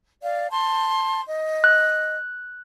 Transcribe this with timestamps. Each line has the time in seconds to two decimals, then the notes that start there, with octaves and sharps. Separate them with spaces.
0.22 D5 F5
0.50 A5 C6
1.28 D#5
1.64 F#6